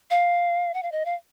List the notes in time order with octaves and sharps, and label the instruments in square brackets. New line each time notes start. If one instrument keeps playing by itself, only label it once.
[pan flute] F5
F#5
F5
D#5
F5